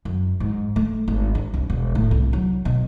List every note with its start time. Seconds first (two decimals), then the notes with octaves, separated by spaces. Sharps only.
0.05 F#2
0.40 G#2
0.76 A3
1.08 G#1
1.35 D4
1.54 C2
1.70 E1
1.95 A2
2.11 C2
2.33 F#3
2.65 B2